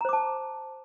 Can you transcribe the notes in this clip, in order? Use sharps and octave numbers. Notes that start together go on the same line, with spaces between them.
C5 A5 A#5 D6